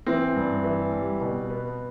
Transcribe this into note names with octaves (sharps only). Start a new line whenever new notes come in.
E3 C4
G2
E3
G3
B2
B3